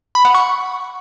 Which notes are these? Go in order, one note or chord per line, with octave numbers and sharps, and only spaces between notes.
B5
F#5
C#6